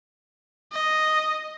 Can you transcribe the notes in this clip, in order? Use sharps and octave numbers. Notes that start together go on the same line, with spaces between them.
D#5